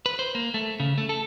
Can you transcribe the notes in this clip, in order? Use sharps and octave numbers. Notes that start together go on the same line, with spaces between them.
B4
C5
A#3
A3
C#3
A3
A4